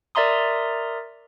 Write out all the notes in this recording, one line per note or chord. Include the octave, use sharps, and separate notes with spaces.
A#4 D5 E5 A#5 C6 D#6